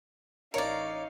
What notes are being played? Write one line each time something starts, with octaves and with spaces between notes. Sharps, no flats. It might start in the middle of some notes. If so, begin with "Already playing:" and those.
A1 D#4 A#4 C#5 D5 F5 C#7